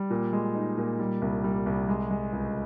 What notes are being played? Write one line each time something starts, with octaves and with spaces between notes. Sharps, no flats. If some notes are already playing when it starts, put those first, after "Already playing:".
Already playing: G3
A#2
G#3
D#4
A#2
G3
C2
G3
C2
G#3
G#3
C#2